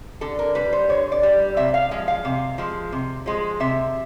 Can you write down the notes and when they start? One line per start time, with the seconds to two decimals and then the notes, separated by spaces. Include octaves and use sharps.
0.21 D3 A4
0.39 A#4
0.55 G3 B4
0.73 C5
0.89 D3 C#5
1.12 D5
1.23 G3
1.57 C3 E5
1.74 F5
1.91 F3 G#3
2.08 F5
2.25 C3
2.58 F3 G#3
2.92 C3
3.26 F3 G#3
3.60 C3 E5